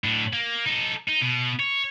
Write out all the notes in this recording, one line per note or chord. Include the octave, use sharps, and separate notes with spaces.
A2 D4
A#3
D#4 A4
D#4
B2
C#5